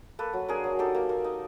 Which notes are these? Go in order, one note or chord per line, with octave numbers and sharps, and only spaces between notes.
A#3 A4 B4
F#3
D4 G#4 A#4
F#3
D#4 G4 A4
A#3
A#3
D#4